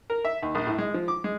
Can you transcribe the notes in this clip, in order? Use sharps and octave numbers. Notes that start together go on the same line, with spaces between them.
A#4
E5
D#2
A#1
A2
G#3
F3
D6
G#3